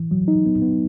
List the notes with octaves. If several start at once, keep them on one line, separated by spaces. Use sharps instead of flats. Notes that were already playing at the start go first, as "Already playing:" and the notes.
Already playing: E3
F#3
D#4
B3
B3